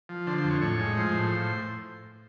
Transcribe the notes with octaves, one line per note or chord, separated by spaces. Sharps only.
F3
D3 C5
C5
F2
C#5
A2 C#5
G#3
F3 C5
A2